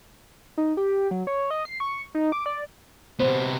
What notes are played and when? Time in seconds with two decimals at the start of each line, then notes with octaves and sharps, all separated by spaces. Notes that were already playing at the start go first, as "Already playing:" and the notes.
0.58 D#4
0.77 G4
1.11 F#3
1.27 C#5
1.51 D#5
1.65 C7
1.80 C#6
2.15 D#4
2.32 D6
2.46 D5
3.20 C3 B3 C5